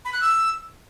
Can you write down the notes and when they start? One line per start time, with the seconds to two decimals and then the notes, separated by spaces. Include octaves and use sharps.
0.05 B5
0.13 F#6
0.21 E6